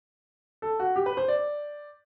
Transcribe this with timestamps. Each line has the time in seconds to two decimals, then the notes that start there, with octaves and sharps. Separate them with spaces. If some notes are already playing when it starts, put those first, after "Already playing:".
0.62 A4
0.80 F#4
0.96 G4
1.06 B4
1.17 C5
1.28 D5